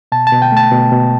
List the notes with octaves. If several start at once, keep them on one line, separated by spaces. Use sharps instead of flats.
B2 A5
A5
B2
G5
A3 A5
B2
B2